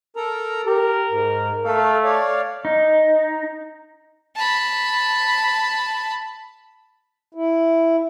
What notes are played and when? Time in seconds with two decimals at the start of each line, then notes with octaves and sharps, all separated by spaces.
0.16 A4 A#4 A#5
0.67 G4 A#4
1.10 G#2
1.65 A3 A4 F5
2.04 C#5 D5 F5
2.65 D#4
4.36 A5 B5
7.35 E4